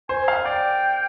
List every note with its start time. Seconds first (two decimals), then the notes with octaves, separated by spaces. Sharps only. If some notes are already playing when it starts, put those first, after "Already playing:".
0.09 C5 G#5
0.28 F5
0.45 D5 G5